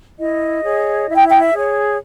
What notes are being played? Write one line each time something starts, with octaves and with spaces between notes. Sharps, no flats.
E4 D#5
G#4 C#5
E4 E5
G5
E5
G5
E5
G#4 C#5